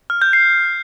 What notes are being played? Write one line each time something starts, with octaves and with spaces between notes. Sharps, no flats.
F6
G6
C7